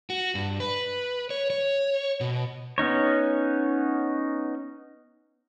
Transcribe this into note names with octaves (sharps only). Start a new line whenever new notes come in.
F#4
G2
B4
C#5
C#5
B2
B3 C#4 D#4 C#5